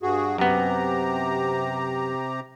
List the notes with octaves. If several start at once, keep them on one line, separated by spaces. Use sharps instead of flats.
G2 F#4 G#4
F#2 C3 B3 G4 A#5